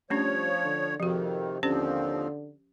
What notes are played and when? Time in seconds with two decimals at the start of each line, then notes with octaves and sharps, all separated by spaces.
0.10 F3 G3 A3 C#4 D4 C#5
0.64 D3
1.00 F2 C3 D#3 F3 F#4
1.63 D#2 D3 F3 C4 C#4 G4 C5